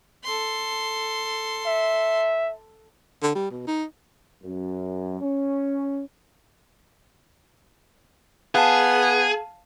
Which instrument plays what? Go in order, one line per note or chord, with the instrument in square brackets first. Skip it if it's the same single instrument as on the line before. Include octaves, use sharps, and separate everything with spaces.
[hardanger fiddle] A4 C6
[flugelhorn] E5
[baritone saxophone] D3
G3
B2
D#4
[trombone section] F#2
C#4
[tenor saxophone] B3 [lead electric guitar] G#4 [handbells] F5 A5